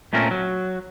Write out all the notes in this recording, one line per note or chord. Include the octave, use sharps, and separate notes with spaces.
A#2 A3 C4 C#4 A#4
F#3